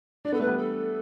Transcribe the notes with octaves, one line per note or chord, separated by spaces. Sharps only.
D4 D5
B3 A4
A3 B4
G3 B3
A4